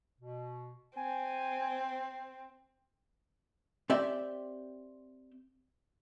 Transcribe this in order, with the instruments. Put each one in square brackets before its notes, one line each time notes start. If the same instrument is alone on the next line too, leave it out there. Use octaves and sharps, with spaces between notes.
[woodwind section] B2
[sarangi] C4 [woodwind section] G#5
[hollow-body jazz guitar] C4 G4 D5 E5 G5